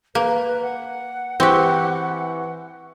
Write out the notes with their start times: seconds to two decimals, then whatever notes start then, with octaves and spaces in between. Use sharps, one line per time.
0.15 A#3 B4
0.63 F#5
1.40 E3 C4 G4 C#6 F#6